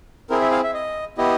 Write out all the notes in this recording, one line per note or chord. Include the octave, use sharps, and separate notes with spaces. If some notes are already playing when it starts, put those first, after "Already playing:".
C4 E4 G#4 A#4
E5
F5
E5
D#5
B3 E4 G4 D#5